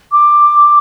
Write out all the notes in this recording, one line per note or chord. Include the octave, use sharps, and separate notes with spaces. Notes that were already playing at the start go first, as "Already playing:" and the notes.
D6